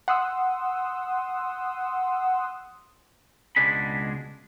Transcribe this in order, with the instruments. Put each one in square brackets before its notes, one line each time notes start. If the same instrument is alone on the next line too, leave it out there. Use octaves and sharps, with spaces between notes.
[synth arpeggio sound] F#5 C6 D#6 E6
[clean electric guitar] C#2 B2 G#3 D4 G#4 B5